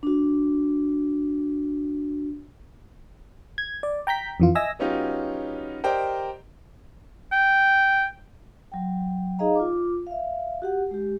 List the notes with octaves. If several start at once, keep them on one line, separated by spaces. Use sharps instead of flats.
D4 F#4
G#6
D5
G5 A#5 G6 B6
F2 E3 F4
D#5 E5 G#5 E6 A#6
F#3 B3 C#4 D#4 F4 G4
G4 A#4 C5 D5 D#5 G5
G5
F#3 G5
D#4 G#4 D#5 F5 A#5
F4 D6
E5 F5
F#4 G4 F#5
G#3 G4